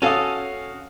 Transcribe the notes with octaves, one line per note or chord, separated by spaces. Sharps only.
C#4 F#4 A4 F5 D#6